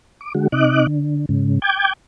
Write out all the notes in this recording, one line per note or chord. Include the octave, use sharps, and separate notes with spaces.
D6
D3 G#3 F#4
C3 D#4 D#5 D6 F#6
D3
G#2 C#3
G5 D6 G6 G#6